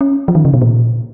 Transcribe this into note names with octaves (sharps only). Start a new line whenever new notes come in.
C#4
F3
D#3
C#3
B2
A#2